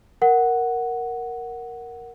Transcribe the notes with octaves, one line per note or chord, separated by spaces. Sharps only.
A#4 F#5